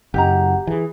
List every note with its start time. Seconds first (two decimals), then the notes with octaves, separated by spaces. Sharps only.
0.14 F#1 G4 D#5 F#5 A#5
0.67 E3 G#4